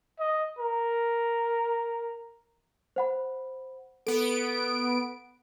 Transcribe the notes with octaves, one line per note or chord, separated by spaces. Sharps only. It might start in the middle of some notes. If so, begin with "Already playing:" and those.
D#5
A#4
C5 F#5 B5
B3 A4 D7